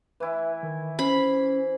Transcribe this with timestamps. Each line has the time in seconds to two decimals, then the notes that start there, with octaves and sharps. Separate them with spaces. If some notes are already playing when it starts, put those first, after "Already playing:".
0.20 E3 E4 B4
0.63 D#3
0.99 C#4 C5 B5